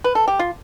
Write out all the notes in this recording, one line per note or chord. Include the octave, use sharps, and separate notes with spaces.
B4
A4
G4
F4